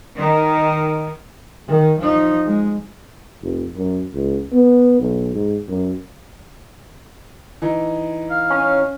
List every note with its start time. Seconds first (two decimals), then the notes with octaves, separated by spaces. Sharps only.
0.17 D#3
1.68 D#3
1.99 F3 D#4
2.46 G#3
3.43 F1
3.76 F#2
4.13 C#2
4.52 B3
5.00 B1
5.34 G#2
5.68 F#2
7.62 E3 D#4
8.30 F5
8.50 C#4